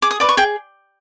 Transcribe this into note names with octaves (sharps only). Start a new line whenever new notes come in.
G#4 D6
D#6
B4 D5 D6
C#6
G#4 G5